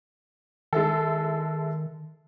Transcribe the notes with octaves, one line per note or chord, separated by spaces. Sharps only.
D#3 G#3 E4 A4